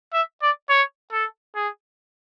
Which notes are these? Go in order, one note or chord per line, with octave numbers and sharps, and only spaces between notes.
E5
D5
C#5
A4
G#4